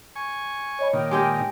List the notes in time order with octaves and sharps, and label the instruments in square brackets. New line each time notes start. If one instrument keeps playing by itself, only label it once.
[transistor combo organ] G#5 C#6
[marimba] C#5 D#5 B5
[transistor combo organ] A#2 D#3 [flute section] G5
[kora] G#3 G4 D#5 [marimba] D6